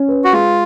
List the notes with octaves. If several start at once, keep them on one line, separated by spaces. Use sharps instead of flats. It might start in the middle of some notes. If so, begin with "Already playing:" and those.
Already playing: C#4
B4
F#4
G#3 F4